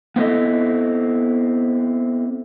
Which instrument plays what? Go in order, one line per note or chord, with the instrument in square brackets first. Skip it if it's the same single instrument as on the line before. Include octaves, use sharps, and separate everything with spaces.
[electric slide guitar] B3 C4 E4 A4 D#5